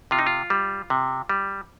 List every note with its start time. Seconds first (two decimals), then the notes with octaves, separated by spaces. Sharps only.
0.11 C3 F4
0.19 D#4
0.26 F4
0.50 G3
0.90 C3
1.29 G3